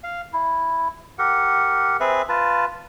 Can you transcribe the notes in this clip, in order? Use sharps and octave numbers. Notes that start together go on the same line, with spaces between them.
F5
E4
G4 A#4 F#5
C4 G#4 B4 E5
F4 B4 A5